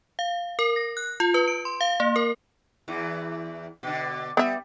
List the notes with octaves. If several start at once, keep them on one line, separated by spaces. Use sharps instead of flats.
F5
A#4
A#6
F#6
F4
B4
D7
C6
F5
A#3
A#4
E2 E3
B2 D3
G3 B3 E5